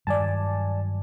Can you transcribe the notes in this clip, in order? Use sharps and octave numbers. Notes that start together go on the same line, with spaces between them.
G2 D#3 F#3 D5 G#5 A5